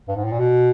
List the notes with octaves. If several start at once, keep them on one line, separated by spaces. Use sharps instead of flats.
G2
G#2
A2
A#2
B2